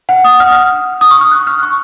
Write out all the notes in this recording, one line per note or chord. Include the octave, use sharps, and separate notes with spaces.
F#5
D#6
F6
F6
D#6
C#6
F6
F#6
F6
C#6